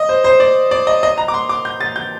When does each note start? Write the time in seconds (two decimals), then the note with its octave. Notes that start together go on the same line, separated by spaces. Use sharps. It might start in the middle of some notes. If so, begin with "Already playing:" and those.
Already playing: D#5
0.09 C5
0.24 C5
0.40 D5
0.71 D5
0.87 D#5
1.03 D#5
1.18 A#5
1.28 D6
1.34 C6
1.49 D6
1.65 G6
1.81 A6
1.96 G6